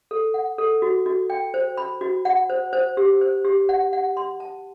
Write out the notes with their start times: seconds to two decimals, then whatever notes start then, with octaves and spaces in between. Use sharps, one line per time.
0.11 A4
0.34 F#5
0.58 A4
0.82 F#4
1.06 F#4
1.30 G5
1.54 C5
1.77 B5
2.01 F#4
2.25 F#5
2.50 C5
2.73 C5
2.97 G4
3.21 C5
3.45 G4
3.69 F#5
3.93 F#5
4.17 C6
4.40 A5